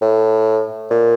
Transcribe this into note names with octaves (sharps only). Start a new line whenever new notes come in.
A2
A#2